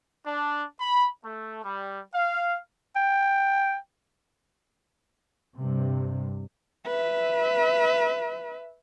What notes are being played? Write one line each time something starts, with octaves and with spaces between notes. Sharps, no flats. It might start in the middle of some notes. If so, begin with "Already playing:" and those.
D4
B5
A3
G3
F5
G5
G2 C3
B4 E5